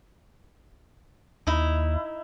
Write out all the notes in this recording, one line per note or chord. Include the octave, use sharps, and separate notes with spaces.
D#2 D#4 E4